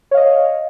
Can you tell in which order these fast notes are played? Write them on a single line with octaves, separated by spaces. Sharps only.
C#5 F5 D#5